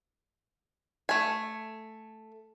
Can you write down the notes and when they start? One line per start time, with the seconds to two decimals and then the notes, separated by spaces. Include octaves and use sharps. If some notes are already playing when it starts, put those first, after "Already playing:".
1.09 A3 G#5